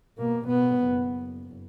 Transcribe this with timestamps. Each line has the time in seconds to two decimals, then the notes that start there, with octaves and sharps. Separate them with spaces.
0.18 B2 A#3
0.46 B2 B3
0.84 F#1